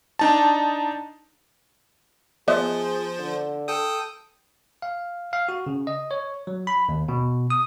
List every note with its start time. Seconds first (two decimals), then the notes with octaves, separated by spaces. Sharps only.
0.19 D4 D#4 A5
2.48 F3 B3 G#4 C5 D#5 E5
3.19 D3
3.68 A4 G5 D#6
4.82 F5
5.33 F5
5.49 F#4
5.66 C#3
5.87 D#5
6.11 C#5
6.47 F#3
6.67 B5
6.89 D#2
7.09 B2
7.50 D#6